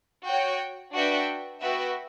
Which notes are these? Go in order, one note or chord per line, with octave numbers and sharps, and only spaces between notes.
F#4 C#5 G5
D4 F#4 B4 E5 G5
B3 F#4 B4 E5 G5